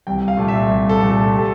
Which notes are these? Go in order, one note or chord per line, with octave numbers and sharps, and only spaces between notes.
C2 G5
F5
A#2 A3
E5
C2
A4
A#2 A3
A4
G4
A4